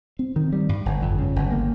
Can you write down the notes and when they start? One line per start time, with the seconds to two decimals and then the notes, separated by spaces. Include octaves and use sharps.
0.19 C4
0.36 D#3
0.53 G3
0.69 G2
0.86 G1
1.02 F2
1.19 C#3
1.36 G1
1.52 A#3